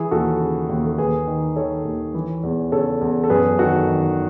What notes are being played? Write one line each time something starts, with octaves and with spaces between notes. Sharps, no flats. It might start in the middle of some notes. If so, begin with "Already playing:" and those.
Already playing: E3 E4 G#4
D#2 F#4 A4
C#3
D#2
A4
D#2 G#4 B4
D#3
D#3 A4 C#5
D#2
E3
E2
C#3 A4 C#5
E2
A4
F#2 G#4 B4
D#3 F#4 A4
D#3